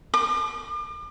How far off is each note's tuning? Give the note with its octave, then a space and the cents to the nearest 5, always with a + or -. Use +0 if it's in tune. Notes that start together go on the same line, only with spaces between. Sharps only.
D6 +40